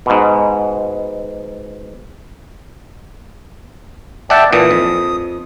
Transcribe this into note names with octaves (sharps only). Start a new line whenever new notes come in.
G#2 B2
D5 E5 F#5 G5 A5
A#2 E3 D#6
F2